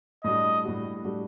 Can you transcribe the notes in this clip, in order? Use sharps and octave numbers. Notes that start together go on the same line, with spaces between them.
A2 G3 D4 F#4 D#5
A2 G3 D4 F#4
A2 G3 D4 F#4